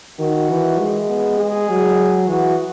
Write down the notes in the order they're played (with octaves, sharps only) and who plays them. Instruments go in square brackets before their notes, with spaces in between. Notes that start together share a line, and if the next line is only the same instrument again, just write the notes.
[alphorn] D#3 [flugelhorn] F#4
[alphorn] E3
G#3
[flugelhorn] B3
G#4
[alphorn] F#3
[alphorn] E3 [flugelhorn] F#4